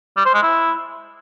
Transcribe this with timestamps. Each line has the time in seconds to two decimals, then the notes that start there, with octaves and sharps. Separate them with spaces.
0.17 G3
0.25 C5
0.34 G#3
0.43 E4